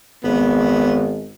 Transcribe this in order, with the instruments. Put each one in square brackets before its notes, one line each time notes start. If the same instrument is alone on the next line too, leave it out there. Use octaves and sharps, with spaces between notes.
[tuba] G#1 [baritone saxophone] B3